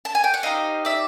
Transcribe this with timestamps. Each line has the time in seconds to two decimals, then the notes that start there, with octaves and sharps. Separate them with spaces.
0.05 A5
0.15 G#5
0.24 G5
0.34 F#5
0.43 C4 D#4 G4 D#5 F5
0.85 D5 E5